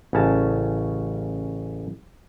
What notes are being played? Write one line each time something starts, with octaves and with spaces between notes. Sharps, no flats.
A1 C#3 C#4 A5